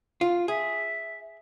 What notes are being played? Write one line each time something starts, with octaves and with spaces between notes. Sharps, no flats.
F4
G#4 E5